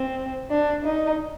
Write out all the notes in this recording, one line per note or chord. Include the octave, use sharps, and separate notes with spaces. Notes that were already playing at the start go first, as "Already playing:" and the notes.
Already playing: C4
D4
D#4